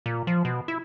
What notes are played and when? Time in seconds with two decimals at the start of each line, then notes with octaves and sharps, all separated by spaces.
0.06 A#2
0.27 F3
0.45 B2
0.68 E4